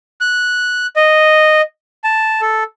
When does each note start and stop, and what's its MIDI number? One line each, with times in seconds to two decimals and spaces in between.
0.21 0.86 90
0.96 1.61 75
2.04 2.41 81
2.41 2.63 69